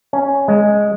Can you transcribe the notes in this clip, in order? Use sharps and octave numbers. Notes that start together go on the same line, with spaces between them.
C#4
G#3